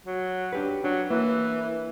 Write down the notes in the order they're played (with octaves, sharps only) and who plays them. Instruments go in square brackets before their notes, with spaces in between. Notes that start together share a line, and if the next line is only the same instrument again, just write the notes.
[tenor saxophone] F#3
[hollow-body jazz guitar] D4 G4 B4
[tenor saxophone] F#3 [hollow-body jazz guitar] D4
[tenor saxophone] E3 [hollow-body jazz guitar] A#3